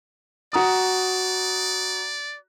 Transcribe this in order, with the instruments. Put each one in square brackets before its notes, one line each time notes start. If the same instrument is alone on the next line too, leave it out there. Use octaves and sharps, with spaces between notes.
[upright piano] F#4 A#5 D#6 [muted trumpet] D5